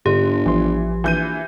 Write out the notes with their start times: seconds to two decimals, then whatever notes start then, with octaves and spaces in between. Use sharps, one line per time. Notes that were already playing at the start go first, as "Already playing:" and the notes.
0.06 G1 G#2 D3 G4
0.46 A1 E3 F3 C6
1.04 A#1 E3 G6 D#7